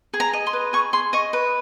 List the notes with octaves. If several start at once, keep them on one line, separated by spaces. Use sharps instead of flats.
G#4
A#5
D#5
C6
B4
G#4 C#6
G#4 C6
D#5 C#6
B4